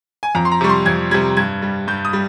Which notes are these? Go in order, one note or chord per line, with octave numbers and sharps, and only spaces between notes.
G#5
F2 A#5
C6
A#5
C3 G3 C#6
C6
F2 G#6
C3 G3 G#6
G2 G#6
G3
G2 G6
D#6
G3